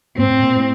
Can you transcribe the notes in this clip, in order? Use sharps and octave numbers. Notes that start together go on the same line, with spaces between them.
G#2 C4
A2
A#2
A2